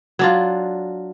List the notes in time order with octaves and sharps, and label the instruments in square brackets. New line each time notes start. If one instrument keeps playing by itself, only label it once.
[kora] F#3 D4 F4